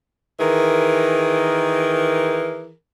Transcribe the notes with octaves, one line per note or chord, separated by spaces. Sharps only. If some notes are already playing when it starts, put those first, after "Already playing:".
D#3 E3 G#4 A#4